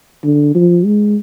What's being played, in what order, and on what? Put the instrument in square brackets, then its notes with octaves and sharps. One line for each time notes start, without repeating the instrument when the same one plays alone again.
[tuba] D3
F3
G#3